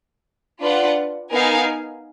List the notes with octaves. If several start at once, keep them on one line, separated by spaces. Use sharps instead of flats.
D4 F4 B4 D5 F#5
B3 D#4 A#4 F5 G#5